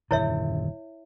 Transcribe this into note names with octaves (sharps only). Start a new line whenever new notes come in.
D#1 F#2 D3 E4 C#5 E5